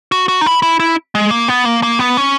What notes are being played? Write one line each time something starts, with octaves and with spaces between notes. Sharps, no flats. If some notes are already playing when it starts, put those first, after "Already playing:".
F#4
F#4
D#4
E4
E4
E4
G#3
A#3
B3
A#3
A#3
B3
C#4